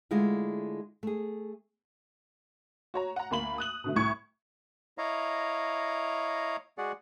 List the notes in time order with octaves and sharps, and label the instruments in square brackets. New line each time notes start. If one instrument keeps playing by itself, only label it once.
[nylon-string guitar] D3 G#3 A3 E4 F4
A3 G#4
[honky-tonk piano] F#4 C#5 A#5
F#5 A#5
D2 A#3 B5 F#7
D#6 F#6 F#7
B2 D3 A3
C2 A2 C#6 G#6 C#7
[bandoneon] E4 C#5 D#5 F5 A#5
G#3 F#4 G#4 D5 F#5